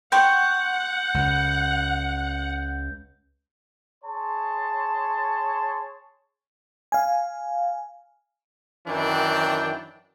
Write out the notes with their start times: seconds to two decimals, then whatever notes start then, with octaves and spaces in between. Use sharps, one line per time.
0.12 F#5 G5 C6 C#6 G6
1.14 C#2
4.04 G#4 C#5 A5 C6
6.92 F5 G#5
8.88 F#2 D#3 E3 D4 G5